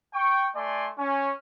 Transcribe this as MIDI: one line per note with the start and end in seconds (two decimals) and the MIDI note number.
0.14 0.48 79
0.14 0.48 85
0.55 0.89 57
0.55 0.89 74
0.55 0.89 80
0.55 0.89 84
0.98 1.32 61